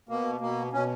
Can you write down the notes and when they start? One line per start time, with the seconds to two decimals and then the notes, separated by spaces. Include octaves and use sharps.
0.09 B2 A#3
0.41 B2 A#3
0.73 B2 C#4